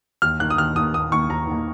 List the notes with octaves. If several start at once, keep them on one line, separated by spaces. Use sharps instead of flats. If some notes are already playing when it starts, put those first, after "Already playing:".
D#2 F6
D#3 A#3 F#6
D#6
D#2 F6
D#3 A#3 D#6
D#2 D#6
D#3 A#3 C#6
D#2 A#5
D#3 A#3